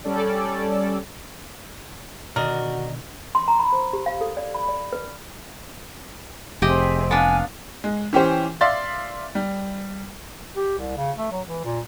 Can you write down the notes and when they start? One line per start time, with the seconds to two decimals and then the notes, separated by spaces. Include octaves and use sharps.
0.04 G3 C#4 A4 D5
2.36 B2 D3 D#3 F#4 A#4 D5 D#5
3.35 C6
3.48 A#5
3.59 B5
3.73 C5
3.93 G4
4.06 F5
4.21 A4
4.37 D5
4.55 B5
4.69 D5
4.93 B4
6.62 F1 C4 G4 G#4 D#5 E5
7.11 B3 D4 F5 G#5
7.84 G#3
8.13 E3 C#4 G4 C5
8.61 D5 E5 F5 C6 A6
9.35 G3
10.56 G4
10.78 C2
10.97 C#3
11.18 A3
11.32 F#3
11.46 E3
11.65 A#2